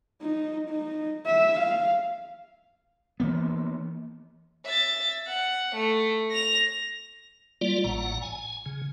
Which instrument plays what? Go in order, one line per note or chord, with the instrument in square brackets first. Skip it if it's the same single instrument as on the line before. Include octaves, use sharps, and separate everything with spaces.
[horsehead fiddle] D#4
D#4
E5
F5
[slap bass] E3 A#3 B3
[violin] E5 A6
F#5
A3
A#6 F7
[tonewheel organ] G3 A#3 F4 D5
A1 A2 F#5 A#5
G#5
C#3